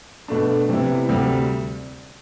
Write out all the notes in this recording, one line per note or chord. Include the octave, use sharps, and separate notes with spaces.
B2 A3 D4
C3 G3 B3 E4
D2 C3 G3